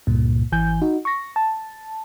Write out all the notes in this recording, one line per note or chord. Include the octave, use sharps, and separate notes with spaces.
C#2 G2 A#2
G#1 E3 G#5 G6
D#4 F#4
C#6 A#6
A5